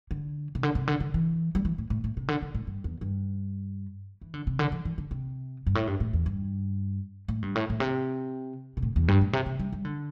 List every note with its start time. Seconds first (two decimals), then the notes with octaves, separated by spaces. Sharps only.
0.11 D3
0.55 C3
0.63 D3
0.75 C3
0.88 D3
1.00 D3
1.14 E3
1.55 G3
1.65 E3
1.78 A2
1.90 A2
2.04 A2
2.17 C3
2.28 D3
2.42 D3
2.55 A2
2.67 G2
2.84 E2
3.01 G2
4.21 E3
4.34 D3
4.47 C3
4.59 D3
4.72 E3
4.85 E3
4.98 D3
5.11 C3
5.66 G2
5.75 A2
5.87 G2
6.00 A2
6.13 E2
6.26 G2
7.28 A2
7.42 G2
7.55 A2
7.70 A2
7.80 C3
8.77 C3
8.82 A2
8.96 E2
9.08 G2
9.21 A2
9.33 C3
9.46 C3
9.59 G3
9.72 G3
9.85 D3